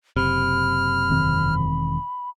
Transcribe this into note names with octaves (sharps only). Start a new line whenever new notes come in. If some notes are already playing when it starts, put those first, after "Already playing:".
F#1 C3 B5 F6
E1 D#3 C4